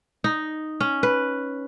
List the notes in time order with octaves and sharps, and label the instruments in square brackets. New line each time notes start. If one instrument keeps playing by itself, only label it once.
[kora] D#4
C#4
B4